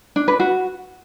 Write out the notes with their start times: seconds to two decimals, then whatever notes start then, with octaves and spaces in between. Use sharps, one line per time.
0.16 D4
0.28 B4
0.40 F#4